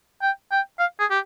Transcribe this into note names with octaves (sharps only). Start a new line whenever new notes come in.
G5
G5
F5
G#4
G4